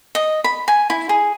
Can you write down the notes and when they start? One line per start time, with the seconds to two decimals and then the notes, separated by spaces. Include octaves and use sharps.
0.15 D#5
0.44 B5
0.68 G#5
0.90 E4
1.09 G#4